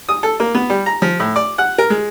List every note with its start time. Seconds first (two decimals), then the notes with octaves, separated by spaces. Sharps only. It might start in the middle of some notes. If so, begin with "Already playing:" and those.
0.09 D#6
0.23 A4
0.40 A#3
0.55 B3
0.70 G3
0.86 A#5
1.02 F3
1.20 A2
1.36 D5
1.58 F#5
1.78 A#4
1.90 G#3